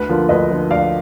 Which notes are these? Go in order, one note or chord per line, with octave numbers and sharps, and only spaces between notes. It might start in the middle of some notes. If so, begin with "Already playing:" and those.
Already playing: D2 B4
D3 F3 A#3
D2 B4 D#5
D3 F3 A#3
D2 D5 F5